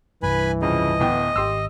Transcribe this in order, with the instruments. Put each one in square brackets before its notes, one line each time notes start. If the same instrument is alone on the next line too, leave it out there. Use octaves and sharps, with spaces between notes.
[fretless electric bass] C2 G2 [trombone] E3 [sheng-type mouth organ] B4 G#5 B5
[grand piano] F2 C#3 [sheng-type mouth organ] D#5
[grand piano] D1 B3 G5
[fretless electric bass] G#1 [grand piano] G4 C6 E6